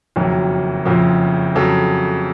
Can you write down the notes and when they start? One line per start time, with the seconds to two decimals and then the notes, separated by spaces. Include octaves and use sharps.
0.16 F#1 F2 D#3 F#3
0.85 F#1 F2 C#3 F3
1.55 F2 C#3 F#3 A4